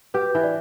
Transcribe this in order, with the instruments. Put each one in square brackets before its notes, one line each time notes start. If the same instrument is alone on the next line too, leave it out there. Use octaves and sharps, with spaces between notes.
[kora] G4 [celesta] B4
[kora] E3
[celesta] D5